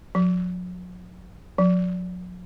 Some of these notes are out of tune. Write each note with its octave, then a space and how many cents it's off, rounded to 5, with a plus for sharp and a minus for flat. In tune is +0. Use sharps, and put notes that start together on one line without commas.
F#3 -45
F#3 -45